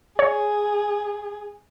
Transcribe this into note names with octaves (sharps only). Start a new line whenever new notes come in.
G#4 C#5